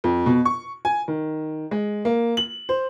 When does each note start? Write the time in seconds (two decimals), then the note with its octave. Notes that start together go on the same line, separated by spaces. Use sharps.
0.04 F2
0.26 B2
0.45 C#6
0.85 G#5
1.08 D#3
1.71 G#3
2.05 A#3
2.37 F#7
2.69 C5